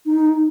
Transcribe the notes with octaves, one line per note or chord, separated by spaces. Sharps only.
D#4